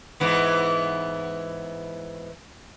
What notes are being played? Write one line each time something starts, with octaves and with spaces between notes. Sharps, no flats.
G#2 E3 B3